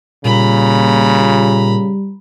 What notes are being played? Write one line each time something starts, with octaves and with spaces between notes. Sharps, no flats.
A#2 C#3 G3 A#5 B5